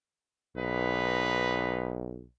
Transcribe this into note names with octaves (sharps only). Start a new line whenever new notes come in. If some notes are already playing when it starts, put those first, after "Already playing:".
B1 A#3 D#4 B4